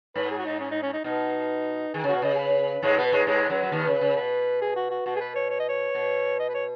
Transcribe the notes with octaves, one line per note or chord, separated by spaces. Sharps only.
G#2 B4
G#4
F#4
D#4
C#4
D#4
C#4
D#4
B2 D#4
D#3 G#4
C#3
B2 F#4
C#3 D#5
G#4
B4
G#2 G#3
B2 B3
G#2 G#3
G#2 G#3
F#2 F#3
F#3
D#2 D#3
C#3
C#3
B2 B4
G#4
F#4
F#4
B2 F#4
G#4
B4
C#5
C#5
D#5
C#5
B2
D#5
B4
C#5